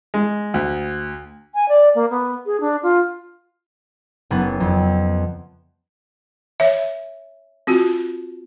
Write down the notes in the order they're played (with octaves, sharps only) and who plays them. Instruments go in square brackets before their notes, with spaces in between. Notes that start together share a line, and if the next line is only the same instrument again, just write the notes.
[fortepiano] G#3
D2
[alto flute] G#5
D5
A#3
B3
G#4
D4
F4
[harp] F#1 B3
F2
[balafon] C#5 E5
C4 F4 F#4